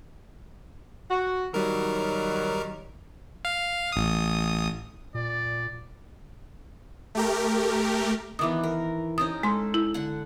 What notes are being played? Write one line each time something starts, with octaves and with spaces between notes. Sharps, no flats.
F#4
D#3 F#3 G3 A#4
F5
A1 D#6
A#2 D5
A3 G4 A#4
D#3 E3 B3 D6 D#6
A#4
C#4 D#4 G4 D#6
G#3 A4 C6
E4
D3 F#5